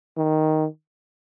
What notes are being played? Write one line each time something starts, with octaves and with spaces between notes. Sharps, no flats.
D#3